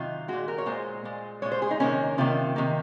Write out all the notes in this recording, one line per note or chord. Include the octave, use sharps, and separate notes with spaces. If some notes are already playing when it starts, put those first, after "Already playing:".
Already playing: C3 D#3 F#3 F4
A#2 G#3 F#4
A#4
C#5
A#2 G#3 C5
A#2 G#3
A#2 G#3 C#5
C5
G#4
D#4
C3 D#3 A#3 C#4
C3 D#3 A#3 F4
C3 D#3 A#3